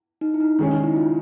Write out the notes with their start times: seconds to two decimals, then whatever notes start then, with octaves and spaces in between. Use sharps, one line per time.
0.21 D#4
0.34 E4
0.40 D#4
0.59 D#3 G#3 C#4 D4
0.71 D#4
0.83 E4
0.96 F4